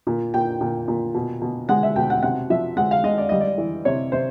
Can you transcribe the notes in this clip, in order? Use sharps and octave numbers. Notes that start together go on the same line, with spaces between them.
A#2
A#2 G5
A#2
A#2
B2
B2
G#3 F#5
E5
B2 G5
F#5
C3 F#5
F3 E5
G#3 F#5
F5
G#3 D#5
D5
G3 D#5
D5
E3
C3 C#5
C3 C5